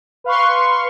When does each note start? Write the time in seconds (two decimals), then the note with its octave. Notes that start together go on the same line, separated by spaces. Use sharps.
0.24 B4 F5 C6 C#6